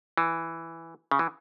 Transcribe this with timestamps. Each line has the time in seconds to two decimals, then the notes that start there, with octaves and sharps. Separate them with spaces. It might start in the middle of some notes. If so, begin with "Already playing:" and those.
0.17 E3
1.11 C#3
1.19 E3